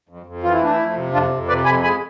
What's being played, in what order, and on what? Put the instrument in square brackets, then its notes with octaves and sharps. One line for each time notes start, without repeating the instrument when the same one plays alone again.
[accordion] F2
F2
E3 F4
E4
A3 D4
E4
F2
C3
F2 D4 F4
F2
C3 B4 D5
F2 G#5 B5
G#3 G#5 B5